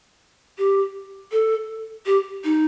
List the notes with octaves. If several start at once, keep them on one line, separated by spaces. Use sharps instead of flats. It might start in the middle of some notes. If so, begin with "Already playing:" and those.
G4
A4
G4
D#4